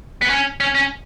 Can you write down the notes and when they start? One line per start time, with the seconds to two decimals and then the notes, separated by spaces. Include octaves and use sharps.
0.22 B3
0.30 C#4
0.60 C#4
0.75 C#4